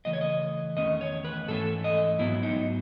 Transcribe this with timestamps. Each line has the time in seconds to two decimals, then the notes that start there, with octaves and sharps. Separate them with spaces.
0.05 C#3 E3 A3 D#5
0.13 C#5
0.21 D#5
0.77 E2 D#3 A3 C#4 D#5
1.01 C#5
1.25 B4
1.48 G#2 E3 A3 C#4 A4
1.84 D#5
2.19 G#2 F#3 B3 E4
2.43 D#4